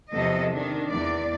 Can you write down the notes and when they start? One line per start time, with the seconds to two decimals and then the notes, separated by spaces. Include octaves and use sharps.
0.12 E2 C3 F3 A4 D#5
0.51 D#3 D4
0.87 E2 D5